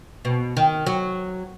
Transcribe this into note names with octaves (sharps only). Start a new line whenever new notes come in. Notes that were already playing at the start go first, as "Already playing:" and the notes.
B2
D#3
F#3